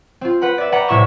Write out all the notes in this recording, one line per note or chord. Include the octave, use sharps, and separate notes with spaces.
C4 F4
B4 F#5 B5
D5 E5
B4 D5 F#5 G5 A#5 B5
C2 A2 E4 E5 C#6 E7